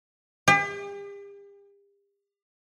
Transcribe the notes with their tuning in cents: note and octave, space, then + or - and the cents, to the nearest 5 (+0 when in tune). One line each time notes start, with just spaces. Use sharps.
G4 +40